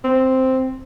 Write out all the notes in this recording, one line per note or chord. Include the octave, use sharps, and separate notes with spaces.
C4